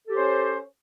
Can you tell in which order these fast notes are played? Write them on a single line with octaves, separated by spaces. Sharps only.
A4 G4 C5 C#4